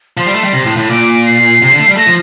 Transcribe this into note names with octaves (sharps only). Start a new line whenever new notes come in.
F3 C6
G3
A3
G3
C3
A2
A2
A#2 D6
C7
C3
D3
A3
G3
A3 A#6
F3